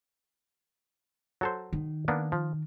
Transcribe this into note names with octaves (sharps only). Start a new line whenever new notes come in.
F#3 A4 C5
D#3
A#3 B3 D4
F3